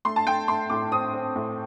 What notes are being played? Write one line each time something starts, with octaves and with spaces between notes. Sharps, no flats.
A3 C6
A5
A3 G5
A3 C6
A2 D6
C4 D#6
C4
A2